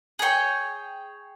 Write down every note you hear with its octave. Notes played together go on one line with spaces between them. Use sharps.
G#4 C#5 G5